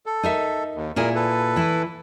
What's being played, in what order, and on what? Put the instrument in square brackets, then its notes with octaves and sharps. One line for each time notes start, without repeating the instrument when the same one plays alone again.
[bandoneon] A4
[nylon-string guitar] D#4 A#4 E5
[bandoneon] D#2
[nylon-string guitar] A#2 E4 G#4 [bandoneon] A#4
[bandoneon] A4 B4
[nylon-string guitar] E3 E4